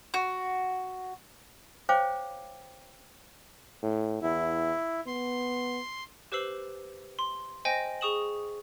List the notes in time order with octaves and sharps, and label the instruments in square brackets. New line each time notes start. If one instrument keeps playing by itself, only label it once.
[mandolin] F#4
[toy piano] C5 C#5 F5 G5 D6
[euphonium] A2
[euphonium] E2 [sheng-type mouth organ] E4
[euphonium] B3 [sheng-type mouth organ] C6
[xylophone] G4 B4 C5 E6 C7 F#7
C6
C5 D#5 G5 G#5 A#6
G#4 C#6 D#6 E7 F#7